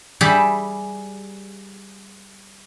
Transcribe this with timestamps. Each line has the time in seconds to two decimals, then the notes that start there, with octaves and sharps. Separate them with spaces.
0.21 G3 G4 G#4 E5 B5